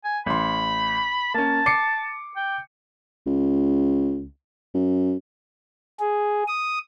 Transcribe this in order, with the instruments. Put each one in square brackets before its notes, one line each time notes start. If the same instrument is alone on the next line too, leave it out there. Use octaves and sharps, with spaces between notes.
[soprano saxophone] G#5
[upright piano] A1 C6 [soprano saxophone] B5
[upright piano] A#3 C#4 [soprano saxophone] A5
[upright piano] D6 C7 C#7
[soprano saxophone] G5
[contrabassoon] C#2
F#2
[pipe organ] G#4
D#6